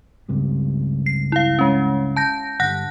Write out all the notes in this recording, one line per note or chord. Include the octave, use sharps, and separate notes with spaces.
C#2 G2 C3
C7
E4 F5
G#3 C#4
A5 G6 A#6
G1 G2 F#5 F#6 A#6